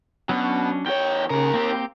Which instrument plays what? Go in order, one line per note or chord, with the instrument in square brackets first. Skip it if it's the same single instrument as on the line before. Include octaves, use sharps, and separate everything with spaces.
[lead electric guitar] B2 [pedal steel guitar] F#3 C#4 D4
[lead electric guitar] E2 C#5 [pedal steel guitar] G5
[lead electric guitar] D#2 A#4 [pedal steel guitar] C#3
[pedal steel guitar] A#3 C4 G4